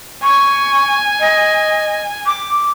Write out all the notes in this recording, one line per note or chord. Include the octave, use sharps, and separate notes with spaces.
G#5 C#6
D#5
D6